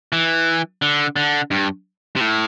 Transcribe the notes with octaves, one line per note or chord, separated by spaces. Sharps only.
E3
D3
D3
G2
C3
A2